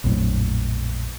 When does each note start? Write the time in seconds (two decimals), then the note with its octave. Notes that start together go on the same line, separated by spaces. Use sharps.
0.04 A#1 F2 A2 F#3